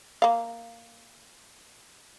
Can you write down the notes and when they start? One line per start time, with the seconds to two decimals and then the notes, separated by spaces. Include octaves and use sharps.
0.22 A#3 F5